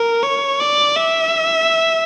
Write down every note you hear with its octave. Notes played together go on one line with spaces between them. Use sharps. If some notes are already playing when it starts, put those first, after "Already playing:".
Already playing: A#4
C#5
D5
E5